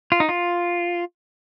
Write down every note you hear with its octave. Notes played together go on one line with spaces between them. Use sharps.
F4
D#4
F4